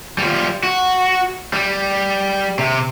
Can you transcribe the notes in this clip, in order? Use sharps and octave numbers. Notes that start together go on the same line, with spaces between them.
G3 F4
F#4
G3
C3